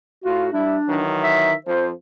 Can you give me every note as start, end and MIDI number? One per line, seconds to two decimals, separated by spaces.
0.24 0.46 45
0.24 0.46 65
0.24 0.47 66
0.52 0.76 55
0.52 1.03 62
0.52 0.76 64
0.88 1.52 51
0.88 1.52 52
0.88 1.52 54
1.23 1.54 76
1.66 1.91 41
1.66 1.91 53
1.66 1.86 72